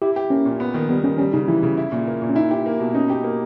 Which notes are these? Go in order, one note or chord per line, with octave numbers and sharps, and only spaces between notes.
E4 G4
G4
A#3 C#4
A#2
B3
D#3
G3 B3
D#3 C#4
G3 C#4
C#3 D#4
E3 E4
C#3
E4
A#2
A#3
A#2
C#4
D#4 E4
G4
A#3
B2
C#4 D#4
G4
A#3